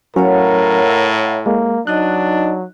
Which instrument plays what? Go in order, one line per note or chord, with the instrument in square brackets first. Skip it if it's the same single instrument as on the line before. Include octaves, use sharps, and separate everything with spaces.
[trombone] A2 [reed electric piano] F#3 C#4 [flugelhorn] A#4 [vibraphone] C#5 F5 F#5
[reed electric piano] E5 A#5
[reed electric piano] G#3 [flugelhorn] A#3
[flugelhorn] F#3 [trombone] D4 [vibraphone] D#4 D#5 [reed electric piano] F#6